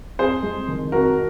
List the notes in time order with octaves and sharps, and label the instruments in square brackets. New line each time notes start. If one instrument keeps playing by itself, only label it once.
[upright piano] F2 [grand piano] G#4 C5
[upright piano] G#3
D#3
[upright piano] F2 [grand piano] F#4 A#4